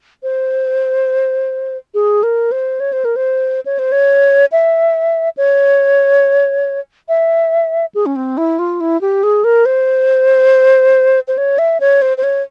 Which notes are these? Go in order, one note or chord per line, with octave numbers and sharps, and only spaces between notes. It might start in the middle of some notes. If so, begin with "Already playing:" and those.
C5
G#4
A#4
C5
C#5
C5
A#4
C5
C#5
C5
C#5
E5
C#5
E5
G#4
C#4
C4
E4
F4
E4
G4
G#4
A#4
C5
C5
C#5
E5
C#5
C5
C5
C#5